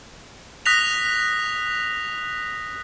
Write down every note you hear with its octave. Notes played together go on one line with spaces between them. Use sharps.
D#6 F#6 A#6 B6 F7